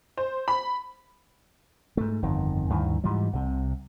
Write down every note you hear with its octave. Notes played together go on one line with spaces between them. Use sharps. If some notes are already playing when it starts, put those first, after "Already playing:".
C5
B5
G#2 A3
G1 F2 D#3
D2 G2 D#3 E3
G#2 E3 F3 G3
C2 C3